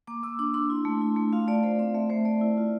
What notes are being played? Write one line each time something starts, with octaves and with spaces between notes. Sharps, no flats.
A#3 D6
A#3 E6
D4 D6
D4 C6
E4
A3
E4
A3
F4 F5
A3 D5
A3 C5
C4 D5
A3 E5
A3 C5
A3 D5
E4
F4